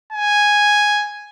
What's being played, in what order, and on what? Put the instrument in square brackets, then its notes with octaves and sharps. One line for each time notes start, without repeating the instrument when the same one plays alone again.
[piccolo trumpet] G#5